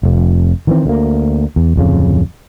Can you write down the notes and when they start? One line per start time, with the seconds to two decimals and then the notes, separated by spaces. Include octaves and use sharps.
0.03 F1 F2
0.67 D#3 E3 C4
0.86 D2 A#3
1.56 E2
1.76 D1 F2 C#3